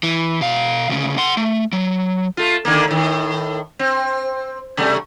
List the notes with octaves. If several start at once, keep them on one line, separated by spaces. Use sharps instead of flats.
E3
B2 F5
D2 C#3
F#5 C6
A3
F#3
A3 F4
D3 D#3 A#3
A2 D#3
C4
C3 G3 A3